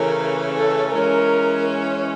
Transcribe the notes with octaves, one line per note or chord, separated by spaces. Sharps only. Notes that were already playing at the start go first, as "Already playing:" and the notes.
Already playing: C#3 E3 A3 C#4 A#4
A4
E3 G#3 C#4 A#4